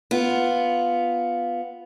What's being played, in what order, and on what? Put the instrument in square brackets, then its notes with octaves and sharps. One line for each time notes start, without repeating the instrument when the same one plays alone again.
[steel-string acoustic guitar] B3 F4